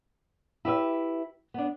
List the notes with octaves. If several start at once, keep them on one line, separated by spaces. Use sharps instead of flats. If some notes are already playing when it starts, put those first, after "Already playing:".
E4 G4 B4 E5
B3 D4